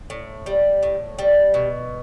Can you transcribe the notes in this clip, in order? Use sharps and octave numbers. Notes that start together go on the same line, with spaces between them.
A2
G3
A2
G3
B2